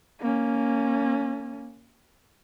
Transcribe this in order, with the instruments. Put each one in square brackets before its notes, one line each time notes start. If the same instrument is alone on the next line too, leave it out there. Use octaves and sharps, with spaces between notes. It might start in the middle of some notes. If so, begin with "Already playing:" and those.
[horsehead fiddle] A#3 C#4